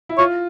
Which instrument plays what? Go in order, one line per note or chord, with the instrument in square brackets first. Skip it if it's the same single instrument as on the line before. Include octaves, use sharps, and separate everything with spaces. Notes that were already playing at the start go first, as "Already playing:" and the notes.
[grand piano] E4
[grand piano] F4 [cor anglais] C#5